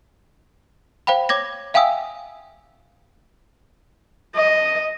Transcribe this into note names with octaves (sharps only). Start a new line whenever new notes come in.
C5 F5 G5 B5
C#5 D6 G#6 A#6
E5 F5 G5 G#5 D#6 E6
D#5